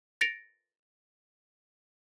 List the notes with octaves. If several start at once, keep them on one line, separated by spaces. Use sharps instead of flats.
A6 A#6 C#7 D7 F7